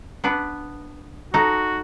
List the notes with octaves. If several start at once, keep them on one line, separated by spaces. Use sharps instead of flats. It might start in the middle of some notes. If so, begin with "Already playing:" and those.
B3 D4 B4
D#4 F#4 A4